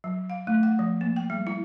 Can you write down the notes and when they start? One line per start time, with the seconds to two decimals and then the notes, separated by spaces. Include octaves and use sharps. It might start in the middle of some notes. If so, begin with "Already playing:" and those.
0.04 F#3
0.30 F5
0.47 A3
0.63 F#5
0.79 F3
1.01 A#3
1.16 G5
1.30 G3
1.47 E4